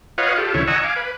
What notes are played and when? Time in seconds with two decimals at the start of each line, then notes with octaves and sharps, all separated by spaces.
0.18 F4 B4 C#5 D#5 F5 F#5
0.38 F4 G4 A4
0.54 D2 C#3 E3 E4 C#5
0.67 D#5 F#5 G#5 A#5 C#6 E6
0.84 F5 G#5 D6
0.96 B4